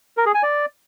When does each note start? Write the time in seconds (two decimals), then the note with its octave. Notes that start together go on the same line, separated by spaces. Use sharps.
0.17 A#4
0.26 G#4
0.34 G#5
0.43 D5